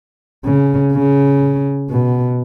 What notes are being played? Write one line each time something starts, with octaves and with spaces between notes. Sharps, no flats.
C#3
C#3
B2